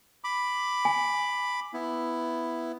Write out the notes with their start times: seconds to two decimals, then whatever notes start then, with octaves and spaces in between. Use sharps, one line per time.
0.24 B5 D6
0.85 G#5
1.74 B3 E4